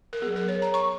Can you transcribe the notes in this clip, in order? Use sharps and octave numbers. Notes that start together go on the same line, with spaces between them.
A#4
F#3 B3 G#4
A#4
C#5
A#5
C#6